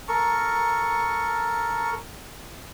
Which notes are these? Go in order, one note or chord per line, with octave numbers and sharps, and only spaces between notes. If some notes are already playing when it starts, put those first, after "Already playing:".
A4 A#4 C#6